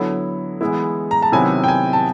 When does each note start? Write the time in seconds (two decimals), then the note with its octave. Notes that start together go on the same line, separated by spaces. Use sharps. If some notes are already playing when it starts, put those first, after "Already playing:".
Already playing: D3 F#3 B3 E4
0.61 E3 G#3 B3 E4
1.11 A#5
1.22 A5
1.32 C3 D#3 F#3 B3 E4 G#5
1.64 G5
1.68 G#5
1.93 A5